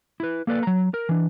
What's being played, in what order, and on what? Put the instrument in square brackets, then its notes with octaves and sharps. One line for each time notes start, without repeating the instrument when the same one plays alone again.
[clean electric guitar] E4 B4
A#3 A4 B4 D5
F#3 A#5
A#4
E3 D4